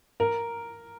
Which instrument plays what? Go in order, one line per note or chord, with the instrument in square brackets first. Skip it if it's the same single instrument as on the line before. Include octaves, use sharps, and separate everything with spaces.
[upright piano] A#4